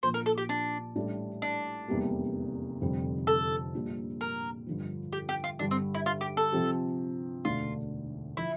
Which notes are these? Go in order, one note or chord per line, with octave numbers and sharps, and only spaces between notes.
A#1 A#2 F3 A#3 C5
A#4
A4
G4
D4
A1 A2 G3 D4 A4
D4
F1 E2 C3 G3 A#3
F1 F2 D3 G3 C4
A4
A#1 A#2 G3 D4 F4
A#4
G2 D3 F3
G4
G4
F4
G2 D3 G3 D4
C4
E4
F4
G4
A4
C3 F3 C4 G4
E1 D2 D3 A3 D4 F4
D3 F3 E4